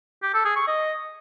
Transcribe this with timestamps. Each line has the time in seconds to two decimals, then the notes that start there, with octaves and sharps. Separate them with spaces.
0.23 G4
0.34 A4
0.45 G#4
0.56 C#6
0.67 D#5